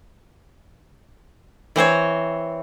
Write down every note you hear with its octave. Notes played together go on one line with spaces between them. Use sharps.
E3 C4 C5 C#5